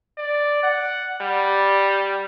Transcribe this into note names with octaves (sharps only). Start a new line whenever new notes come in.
D5
F#5
G3